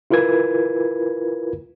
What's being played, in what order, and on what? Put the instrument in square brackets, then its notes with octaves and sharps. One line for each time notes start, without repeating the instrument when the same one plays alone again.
[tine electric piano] E4 F4 A#4 B4 G#6